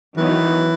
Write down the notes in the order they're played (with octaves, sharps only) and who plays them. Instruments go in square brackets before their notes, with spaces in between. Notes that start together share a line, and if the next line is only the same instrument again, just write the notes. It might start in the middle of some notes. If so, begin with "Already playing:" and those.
[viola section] D#3 F#3 B3 D#4 [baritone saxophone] E3